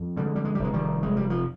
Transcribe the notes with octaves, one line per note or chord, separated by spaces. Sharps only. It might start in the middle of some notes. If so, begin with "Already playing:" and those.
Already playing: F2
D3 G3
G#3
G3
G#3
G3
F1
G#3
D#3 G3
F1 G#3
G3
F3